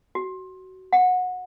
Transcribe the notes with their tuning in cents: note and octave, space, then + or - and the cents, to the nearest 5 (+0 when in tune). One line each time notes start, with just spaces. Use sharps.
F#4 +20
F#5 -20